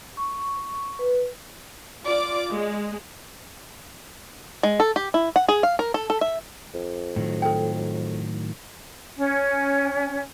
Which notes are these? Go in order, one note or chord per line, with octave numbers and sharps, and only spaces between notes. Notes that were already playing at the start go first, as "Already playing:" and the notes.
C#6
B4
F4 D5 D6
G#3
G#3
A4
G4
E4
F#5
G#4
F5
A#4
A4
A4
E5
F2
A2 D#3 F#3
A4 G5
C#4